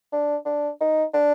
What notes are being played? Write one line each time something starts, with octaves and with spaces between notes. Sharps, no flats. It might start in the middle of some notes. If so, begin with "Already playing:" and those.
D4
D4
D#4
D4